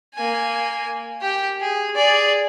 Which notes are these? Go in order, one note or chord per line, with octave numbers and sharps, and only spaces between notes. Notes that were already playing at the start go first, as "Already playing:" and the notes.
A#3 G#5
G4 G5
G#4
G#4 D5